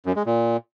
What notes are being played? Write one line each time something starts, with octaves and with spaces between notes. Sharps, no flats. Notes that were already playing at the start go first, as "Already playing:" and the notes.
F#2
G#3
A#2